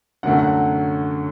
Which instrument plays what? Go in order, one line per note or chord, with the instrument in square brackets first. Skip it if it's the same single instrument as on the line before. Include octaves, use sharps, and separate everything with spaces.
[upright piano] F#2 D3 F#3 A3 [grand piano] F#5
[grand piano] F#5